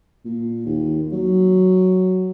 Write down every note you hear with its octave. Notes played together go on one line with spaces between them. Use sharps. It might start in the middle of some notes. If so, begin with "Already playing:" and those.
A#2
D#2
F#3